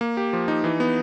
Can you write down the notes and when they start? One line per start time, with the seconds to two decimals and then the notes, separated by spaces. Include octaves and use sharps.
0.01 A#3
0.17 G4
0.33 F3
0.48 D#4
0.64 E3
0.80 B3